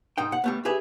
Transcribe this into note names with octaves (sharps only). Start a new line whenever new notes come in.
G#2 D#4 G5
F#5
G3 A3 B3
G4 G#4 B4 E5